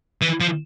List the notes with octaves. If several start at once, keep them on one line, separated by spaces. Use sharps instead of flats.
E3
F3